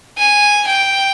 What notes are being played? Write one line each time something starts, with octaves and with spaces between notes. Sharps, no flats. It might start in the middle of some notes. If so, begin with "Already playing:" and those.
G#5
G5